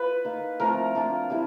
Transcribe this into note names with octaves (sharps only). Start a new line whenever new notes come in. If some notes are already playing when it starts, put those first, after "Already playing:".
Already playing: F4 B4
A#3 D#4
F3 A3 C4 F4 A#4
A#3 D4 F4
G3 C4 E4